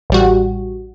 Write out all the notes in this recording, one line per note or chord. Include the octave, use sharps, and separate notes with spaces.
A1 G3 F#4